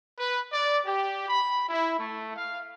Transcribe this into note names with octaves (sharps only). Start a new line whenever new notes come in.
B4
D5
G4
B5
E4
A3
F5